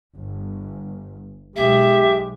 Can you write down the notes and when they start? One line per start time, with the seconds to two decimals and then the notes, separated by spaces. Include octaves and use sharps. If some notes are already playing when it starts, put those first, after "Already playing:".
0.17 G1
1.56 B1 G#3 G4 E5